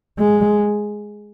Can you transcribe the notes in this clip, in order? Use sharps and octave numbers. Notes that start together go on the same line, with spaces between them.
G#3